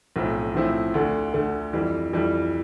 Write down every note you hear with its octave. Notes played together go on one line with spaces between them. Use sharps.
B1 A2 F3 C4 E4
B1 A2 F3 C4 E4
D2 D3 A3
D2 D3 A3
F2 E3 G3
F2 E3 G3